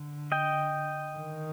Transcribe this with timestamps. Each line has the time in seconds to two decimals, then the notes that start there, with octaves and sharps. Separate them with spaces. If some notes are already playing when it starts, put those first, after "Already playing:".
Already playing: D3
0.32 D#5 G5
1.17 D#3